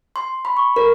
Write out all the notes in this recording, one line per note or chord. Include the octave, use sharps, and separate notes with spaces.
C6
B5
C#6
A#4